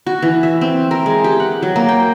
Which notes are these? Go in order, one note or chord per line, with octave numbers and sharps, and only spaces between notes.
F#4
E3
E5
C4
A#4
G#3
G4
F#5
F#3
A#3
G5